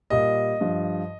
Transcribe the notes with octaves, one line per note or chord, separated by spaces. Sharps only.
A#2 G3 D#5
G2 F3